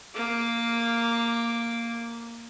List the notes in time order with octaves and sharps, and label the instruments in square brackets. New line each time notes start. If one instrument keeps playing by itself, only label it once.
[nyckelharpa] A#3 D6